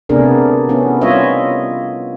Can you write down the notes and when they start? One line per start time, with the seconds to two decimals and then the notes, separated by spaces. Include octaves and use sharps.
0.09 C3 A3 B3 D4 G#4 A#4
0.69 B3 C#4 E4
1.01 G3 F4 C#5 D#5 E5